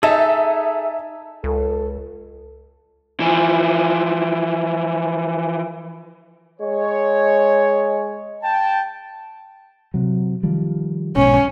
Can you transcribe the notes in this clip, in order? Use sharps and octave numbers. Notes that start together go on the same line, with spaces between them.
D#4 G#4 A4 E5 A5
C#2 A4
E3 F3
G#3 C#5
G5 A5
C3 F#3
D#3 F3 G3
B1 G#2 B2 C#4